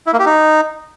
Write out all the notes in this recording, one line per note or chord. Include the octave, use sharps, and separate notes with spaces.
E4
A#3
G4
D#4